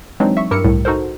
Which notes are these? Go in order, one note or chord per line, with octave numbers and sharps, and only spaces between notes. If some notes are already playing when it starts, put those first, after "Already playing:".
E3 F#3 G#3 C4 D4 D#4
E5 C#6
G2 E4 G4 A#4 E6 C#7
C2 A2
D#4 F#4 A4 A#4 C5